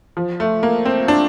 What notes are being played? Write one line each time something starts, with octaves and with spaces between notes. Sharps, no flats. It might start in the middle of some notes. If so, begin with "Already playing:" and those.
F3
A3
A#3
C4
D4